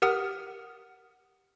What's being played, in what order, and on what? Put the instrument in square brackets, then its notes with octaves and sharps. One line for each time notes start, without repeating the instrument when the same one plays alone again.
[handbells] G4 A#4 F#5 D#6 F6